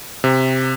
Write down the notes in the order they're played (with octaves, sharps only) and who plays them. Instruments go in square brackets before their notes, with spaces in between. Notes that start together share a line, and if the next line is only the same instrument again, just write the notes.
[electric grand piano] C3